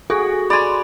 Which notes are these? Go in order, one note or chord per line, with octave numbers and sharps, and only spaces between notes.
F#4 G#4 A4
D5 G#5 B5 C6